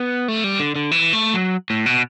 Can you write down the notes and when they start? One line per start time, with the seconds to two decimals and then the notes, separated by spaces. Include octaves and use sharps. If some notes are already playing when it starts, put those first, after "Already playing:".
Already playing: B3
0.28 A3
0.44 G3
0.60 D3
0.76 D3
0.92 E3
1.13 A3
1.34 F#3
1.70 A2
1.86 B2